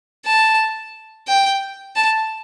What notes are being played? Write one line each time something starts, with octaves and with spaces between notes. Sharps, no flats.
A5
G5
A5